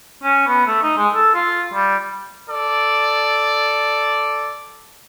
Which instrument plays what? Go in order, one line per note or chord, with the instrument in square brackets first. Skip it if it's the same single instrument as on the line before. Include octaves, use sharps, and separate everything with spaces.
[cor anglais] C#4
B3
A3
D#4
G#3
A4
F4
G3
[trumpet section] A4 D5